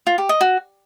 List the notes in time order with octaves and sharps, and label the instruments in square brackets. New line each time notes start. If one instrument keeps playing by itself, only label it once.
[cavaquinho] F4
G4
D#5
F#4